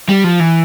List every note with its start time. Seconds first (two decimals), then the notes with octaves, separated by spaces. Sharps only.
0.09 G3
0.24 F3
0.40 E3